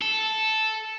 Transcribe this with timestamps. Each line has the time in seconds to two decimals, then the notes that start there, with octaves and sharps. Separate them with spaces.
0.02 A4